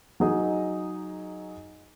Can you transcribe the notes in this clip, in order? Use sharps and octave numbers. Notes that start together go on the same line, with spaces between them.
F#3 D#4 G#4 D#5